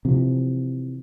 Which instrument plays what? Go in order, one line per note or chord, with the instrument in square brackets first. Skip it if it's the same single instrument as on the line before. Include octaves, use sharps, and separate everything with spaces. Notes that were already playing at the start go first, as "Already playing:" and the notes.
[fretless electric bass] C3 E3 F3